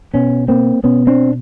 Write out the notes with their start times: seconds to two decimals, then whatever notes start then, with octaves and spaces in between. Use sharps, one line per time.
0.14 B2 B3 C#4
0.48 A#3 C4
0.83 B2 B3 C#4
1.07 C4 D4